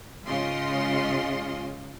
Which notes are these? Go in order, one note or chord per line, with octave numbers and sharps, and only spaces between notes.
G#2 C#3 F4 D#5 C6